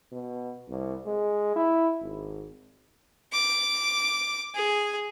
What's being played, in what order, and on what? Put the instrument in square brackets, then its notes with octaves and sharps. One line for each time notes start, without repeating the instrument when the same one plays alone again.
[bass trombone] B2
C2
G#3
E4
G#1
[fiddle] D6
G#4